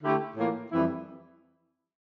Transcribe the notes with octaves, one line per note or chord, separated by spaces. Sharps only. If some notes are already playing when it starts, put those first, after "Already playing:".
D3 A3 E4 G4
A2 E3 A#3 F4
F2 E3 G3 C4 E4